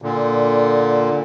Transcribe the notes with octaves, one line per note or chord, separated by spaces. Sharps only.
A#2 D3